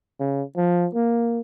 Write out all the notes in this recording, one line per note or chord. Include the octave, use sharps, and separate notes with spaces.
C#3
F3
A#3